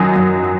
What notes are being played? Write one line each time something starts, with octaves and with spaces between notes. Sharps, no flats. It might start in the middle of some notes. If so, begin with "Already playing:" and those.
Already playing: F#2 D#3 F#3 D#6
F#2